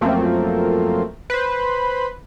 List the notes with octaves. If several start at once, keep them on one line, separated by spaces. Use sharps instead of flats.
F#2 F3 A3 A#3 C4
B4 C5